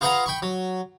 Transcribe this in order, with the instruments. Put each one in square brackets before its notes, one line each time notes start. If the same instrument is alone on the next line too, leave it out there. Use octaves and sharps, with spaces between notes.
[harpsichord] F4 G#4 B4 F5 F#5 A#5
G5 B5 C#6
F#3